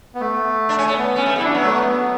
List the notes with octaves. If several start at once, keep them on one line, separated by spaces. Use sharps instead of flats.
B3
A3
D4
C#4
B3
B3
B3 C#4
A3
G3
E4
D4
F#3 B3
A3
B3